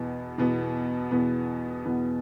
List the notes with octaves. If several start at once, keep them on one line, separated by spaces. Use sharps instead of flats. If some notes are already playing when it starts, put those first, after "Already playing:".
Already playing: E2 B2 B3
E2 B2 B3
E2 B2 B3
E2 B2 B3